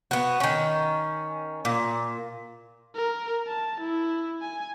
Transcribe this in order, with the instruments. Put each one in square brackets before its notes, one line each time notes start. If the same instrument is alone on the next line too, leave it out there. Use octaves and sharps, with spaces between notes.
[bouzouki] B3 F#4
D#3 C#4
A#2
[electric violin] A#4
A5
E4
G#5